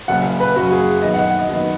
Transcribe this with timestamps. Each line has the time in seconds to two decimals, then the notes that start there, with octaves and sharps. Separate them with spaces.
0.08 F#1 F#2 C#3 F#5
0.40 B4
0.55 F#1 F#2 C#3 F#4
0.72 G#4
1.02 F#2 D#3 B3 D#5
1.14 F#5
1.27 F#5
1.38 D#5
1.49 F#2 D#3 B3